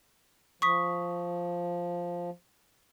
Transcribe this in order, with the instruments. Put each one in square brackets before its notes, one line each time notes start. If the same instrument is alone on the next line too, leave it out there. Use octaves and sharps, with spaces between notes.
[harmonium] F3 [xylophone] C#6 D#6 B6